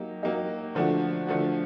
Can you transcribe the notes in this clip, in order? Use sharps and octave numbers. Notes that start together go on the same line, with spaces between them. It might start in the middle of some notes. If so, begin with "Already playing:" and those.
Already playing: F#3 A#3 D#4 G4
F#3 A#3 D#4 G4
D3 F3 A3 D4 F#4
D3 F3 A3 D4 F#4